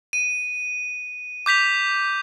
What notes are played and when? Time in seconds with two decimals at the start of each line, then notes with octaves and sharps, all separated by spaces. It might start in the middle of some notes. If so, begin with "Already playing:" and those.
0.13 D#7
1.46 D6 G6 B6 F7